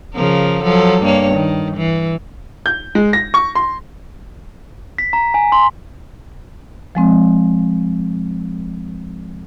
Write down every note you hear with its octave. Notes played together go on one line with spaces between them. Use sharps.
C#3 F3 A#4
F3 F#3 A4
G2 A#3 C#5
D#3
E3
G6
G#3
A#6
C#6
C6
B6
A#5
G#5
C6
F3 G#3 C4